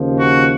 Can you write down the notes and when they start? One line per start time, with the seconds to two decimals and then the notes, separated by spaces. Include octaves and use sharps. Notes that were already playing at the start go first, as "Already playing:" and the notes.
Already playing: D#2 C#3 F3
0.17 F#4